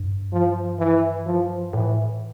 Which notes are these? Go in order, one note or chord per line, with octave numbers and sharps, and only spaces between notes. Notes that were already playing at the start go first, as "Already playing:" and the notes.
Already playing: G2
F3
E3
F3
A2 E3